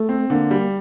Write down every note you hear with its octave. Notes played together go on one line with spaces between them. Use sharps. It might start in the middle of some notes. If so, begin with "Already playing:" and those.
Already playing: A3
C4
D3 A#3
G3